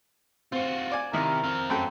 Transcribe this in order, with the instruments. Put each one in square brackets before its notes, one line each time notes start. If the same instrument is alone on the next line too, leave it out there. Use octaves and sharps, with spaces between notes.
[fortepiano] C4 [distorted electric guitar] F4 F#4
[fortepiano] D5 G#5
[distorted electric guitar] C3 [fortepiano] D#3 E4 [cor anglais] A#4
[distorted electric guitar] C4 F5
[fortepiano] F#2 A4 G5